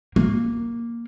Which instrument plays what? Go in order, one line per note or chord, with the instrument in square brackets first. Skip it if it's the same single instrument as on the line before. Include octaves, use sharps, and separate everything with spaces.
[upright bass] A#3